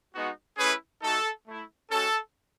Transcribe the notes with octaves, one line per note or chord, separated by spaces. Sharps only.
G#3 B3 D#4 F#4
A3 C#4 E4 G#4 B4
A3 D#4 F#4 A4
A3 E4
G#3 C#4 F#4 A4